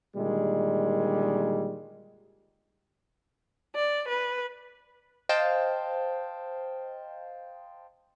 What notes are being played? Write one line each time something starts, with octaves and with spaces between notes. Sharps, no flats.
A#2 D3 D#3 G3 G#3
D5
B4
C5 D#5 F5 G5 A5